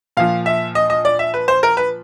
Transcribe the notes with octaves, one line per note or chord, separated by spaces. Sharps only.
A#2 F3 F5
E5
D#5
D#5
D5
E5
B4
C5
A#4
B4